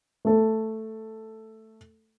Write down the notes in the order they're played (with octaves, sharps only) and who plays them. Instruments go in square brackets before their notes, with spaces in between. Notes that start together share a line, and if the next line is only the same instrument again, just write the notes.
[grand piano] A3 A4